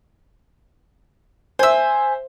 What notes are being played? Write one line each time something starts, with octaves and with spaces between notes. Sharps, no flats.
C5 E5 G#5 E6